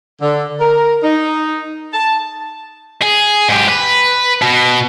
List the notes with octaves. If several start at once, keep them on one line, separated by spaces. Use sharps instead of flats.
D3
A#4
D#4
A5
G#4
G#2 G4
B4
B2